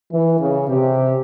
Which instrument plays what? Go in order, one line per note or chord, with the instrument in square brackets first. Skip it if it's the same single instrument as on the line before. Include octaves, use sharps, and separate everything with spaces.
[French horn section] E3
C#3
[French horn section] C3 [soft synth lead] G4